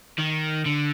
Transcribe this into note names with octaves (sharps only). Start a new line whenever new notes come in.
D#3
D3